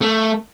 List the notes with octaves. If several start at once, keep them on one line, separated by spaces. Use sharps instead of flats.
A3